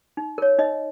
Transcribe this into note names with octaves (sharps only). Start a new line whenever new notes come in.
D#4
A#4 C#5
D#4 D#5